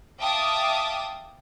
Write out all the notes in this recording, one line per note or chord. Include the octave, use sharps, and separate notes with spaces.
E5 F5 G5 A5 D6 D#6